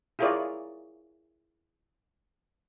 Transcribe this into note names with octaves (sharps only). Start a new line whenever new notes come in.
E4 F4 G#4 A#4 C#5 D5